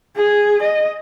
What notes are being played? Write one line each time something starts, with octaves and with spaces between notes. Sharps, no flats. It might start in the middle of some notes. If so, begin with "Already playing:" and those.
G#4
D#5